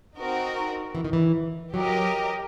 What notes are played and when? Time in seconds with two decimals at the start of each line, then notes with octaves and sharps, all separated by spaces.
0.16 C4 D#4 F#4 A#4
0.95 E3
1.05 D#3
1.13 E3
1.74 F#3 G4 A#4 D#5